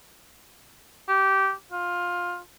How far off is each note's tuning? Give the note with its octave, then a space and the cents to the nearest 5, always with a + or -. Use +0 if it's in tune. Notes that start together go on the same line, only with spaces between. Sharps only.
G4 -20
F4 +15